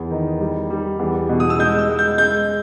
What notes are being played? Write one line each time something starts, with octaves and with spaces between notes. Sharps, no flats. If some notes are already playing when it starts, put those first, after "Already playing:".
Already playing: E2
D#3
G3
G3
E2
B2
D#6
E6
G#3 G6
E6
G#3
G6
G#3 G6